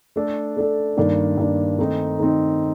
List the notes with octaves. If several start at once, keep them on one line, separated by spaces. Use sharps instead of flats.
A3 D4 A4
A3 D4 A4
G2 D#3 A#3 D4
G2 D#3 A#3 D4
D#3 A3 C4 D#4
D#3 A3 C4 D#4